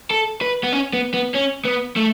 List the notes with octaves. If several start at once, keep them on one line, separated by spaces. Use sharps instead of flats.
A4
B4
B3
C#4
B3
B3
C#4
B3
A3